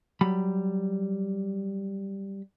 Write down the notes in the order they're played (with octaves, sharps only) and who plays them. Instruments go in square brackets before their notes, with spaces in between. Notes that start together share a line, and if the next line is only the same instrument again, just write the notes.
[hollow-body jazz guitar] F#3 G3 B5